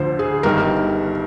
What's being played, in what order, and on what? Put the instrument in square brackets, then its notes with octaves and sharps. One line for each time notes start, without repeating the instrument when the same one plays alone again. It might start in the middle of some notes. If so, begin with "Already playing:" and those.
Already playing: [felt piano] D2 D3 F3 C5
G#4
G1 G2 D#3 A#4